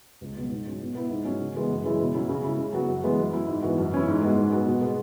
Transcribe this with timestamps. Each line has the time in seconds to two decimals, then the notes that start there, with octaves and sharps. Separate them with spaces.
0.21 C#2
0.36 B2 F#3
0.50 G#2
0.65 F#3 C#4 F#4
0.80 B2
0.95 B3 E4
1.10 G#2
1.25 F#3 C#4
1.40 C#3
1.54 E3 G#3 B3
1.70 F#2
1.84 C#3 E3 G#3 E4
1.99 B2
2.14 F#3 C#4 E4
2.29 C#3
2.44 G#3 C#4 E4
2.58 C#3
2.73 F#3 B3 F#4
2.88 F#2
3.04 E3 G#3 B3
3.18 F#2
3.33 F#3 E4
3.48 G#2
3.62 E3 B3 F#4
3.78 F#2
3.92 E3 C#4 E4
4.07 G#2
4.21 G#3 B3 F#4
4.36 G#2
4.52 F#3 B3 F#4
4.66 B2
4.81 G#3 B3